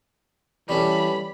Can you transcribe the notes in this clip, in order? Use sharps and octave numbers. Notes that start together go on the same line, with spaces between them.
E3 G3 C#4 A4 B5